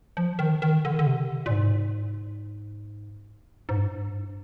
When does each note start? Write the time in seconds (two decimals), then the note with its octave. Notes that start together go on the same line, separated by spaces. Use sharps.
0.17 F3
0.39 D#3
0.62 D#3
0.85 D3
0.92 D#3
0.99 D3
1.07 C3
1.46 A#2
1.51 G#2
3.69 G#2
3.77 G2